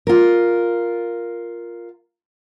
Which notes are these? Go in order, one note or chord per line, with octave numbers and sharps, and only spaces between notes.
F4 A#4